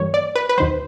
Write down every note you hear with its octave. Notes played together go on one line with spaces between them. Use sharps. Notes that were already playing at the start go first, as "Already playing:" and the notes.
Already playing: G2 E3 G3 A#3 C#5
D5
B4
B4
D#2 D#3 F#3 C5